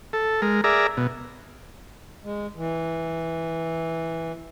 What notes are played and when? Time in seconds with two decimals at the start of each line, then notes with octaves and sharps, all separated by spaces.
0.13 A4
0.42 G#3 A#4
0.64 G#4 A#4 D5 E5 A#5
0.97 B2
2.24 G#3
2.56 E3